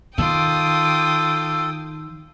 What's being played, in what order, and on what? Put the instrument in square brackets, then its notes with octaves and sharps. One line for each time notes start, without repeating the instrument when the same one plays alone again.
[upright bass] D#3 [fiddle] F4 D6 [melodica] A4 [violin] G5 D#6